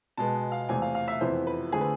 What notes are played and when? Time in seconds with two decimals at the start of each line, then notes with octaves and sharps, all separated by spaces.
0.17 B2 G#3 B3 A5
0.52 F5
0.69 E2 C3 E3 A3 C4 G#5
0.82 F5
0.95 F5
1.08 E5
1.21 F2 C3 E3 B3 C5
1.47 B4
1.73 D3 A3 C4 G#4
1.81 B4